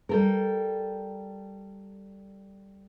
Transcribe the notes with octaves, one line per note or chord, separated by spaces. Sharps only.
G3 A4 A#4